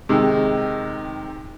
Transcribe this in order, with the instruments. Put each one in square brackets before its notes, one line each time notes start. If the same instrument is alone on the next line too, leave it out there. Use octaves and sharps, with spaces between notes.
[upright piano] C3 D#3 G#3